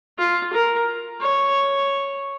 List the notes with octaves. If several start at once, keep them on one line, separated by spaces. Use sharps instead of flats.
F4
A#4
C#5